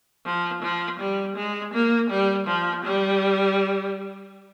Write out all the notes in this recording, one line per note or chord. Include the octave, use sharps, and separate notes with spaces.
F3
F3
G3
G#3
A#3
G3
F3
G3